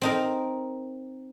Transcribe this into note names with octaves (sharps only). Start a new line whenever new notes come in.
C4 D#4 A#4